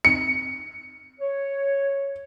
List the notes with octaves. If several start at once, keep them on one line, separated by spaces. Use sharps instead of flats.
C#7
C#5